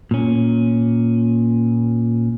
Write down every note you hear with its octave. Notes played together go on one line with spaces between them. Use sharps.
A#2 C#4